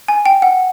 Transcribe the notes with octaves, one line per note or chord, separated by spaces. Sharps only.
G#5
G5
F#5